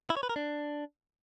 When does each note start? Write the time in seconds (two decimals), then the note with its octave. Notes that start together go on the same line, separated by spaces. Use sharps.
0.10 E4
0.17 C#5
0.23 B4
0.29 A#4
0.36 D4